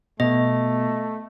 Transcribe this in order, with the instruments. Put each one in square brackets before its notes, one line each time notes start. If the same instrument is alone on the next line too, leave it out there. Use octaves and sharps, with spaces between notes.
[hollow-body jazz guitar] B2 [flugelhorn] A3 [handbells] D#5